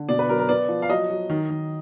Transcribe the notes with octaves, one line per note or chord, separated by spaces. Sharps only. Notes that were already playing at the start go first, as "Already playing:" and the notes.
Already playing: D3
B2 D5
B4
F#3 A#4
A#4
B3 D5
F3
F5
F#3 D#5
F#3
D#3
D#3